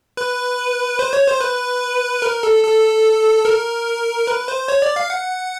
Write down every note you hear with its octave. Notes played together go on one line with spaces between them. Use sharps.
B4
C5
C#5
C5
B4
A#4
A4
A4
A#4
B4
C5
C#5
D5
F5
F#5